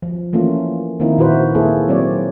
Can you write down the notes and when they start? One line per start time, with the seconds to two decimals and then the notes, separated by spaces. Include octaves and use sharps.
0.02 F3
0.33 E3 A3 A#3 C#4 F4
1.00 D#3 A#3 C4 D#4 E4
1.18 A#2 E4 F#4 B4 C5
1.55 A#3 E4 G#4 A4
1.88 F#3 C4 C#5 D5